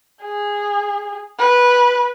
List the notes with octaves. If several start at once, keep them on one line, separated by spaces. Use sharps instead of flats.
G#4
B4